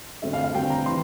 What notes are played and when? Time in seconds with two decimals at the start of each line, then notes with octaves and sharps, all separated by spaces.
0.22 D3 A3 C4 E5
0.33 F5
0.44 F5
0.54 D3 A3 C4 G5
0.70 A#5
0.86 E3 C6